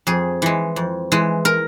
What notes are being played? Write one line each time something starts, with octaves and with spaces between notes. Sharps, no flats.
F2 G#4
E3 G#3
F2
E3 G#3
A#4